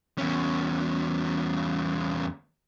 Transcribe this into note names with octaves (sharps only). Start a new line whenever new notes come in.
E2 C#4